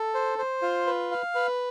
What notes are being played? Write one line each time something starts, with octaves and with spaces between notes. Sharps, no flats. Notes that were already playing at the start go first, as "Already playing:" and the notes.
Already playing: A4
C5
C5
F4
B4
F5
B4